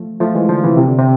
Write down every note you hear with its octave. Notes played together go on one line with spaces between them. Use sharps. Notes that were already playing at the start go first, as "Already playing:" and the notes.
Already playing: F3 A3
F3 A3
E3 G#3
D3 F3
C3 E3
C3
D3
C3